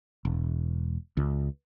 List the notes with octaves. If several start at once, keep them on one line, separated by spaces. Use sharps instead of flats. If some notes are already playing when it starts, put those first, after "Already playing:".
E1
C#2